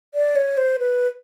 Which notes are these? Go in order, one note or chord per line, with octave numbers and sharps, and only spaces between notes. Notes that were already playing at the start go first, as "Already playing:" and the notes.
D5
C#5
C5
B4